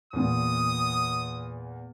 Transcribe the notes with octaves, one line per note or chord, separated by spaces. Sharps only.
E2 A#2 D#6